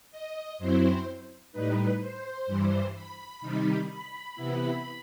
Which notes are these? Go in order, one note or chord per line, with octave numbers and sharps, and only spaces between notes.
D#5
F#2 F#3 C4 E4 C5
A2 G3 D#4 B4
C5
G2 E3 G3
B5
C3 D#3 G3 D#4
B5
C3 E3 B3 E4 B5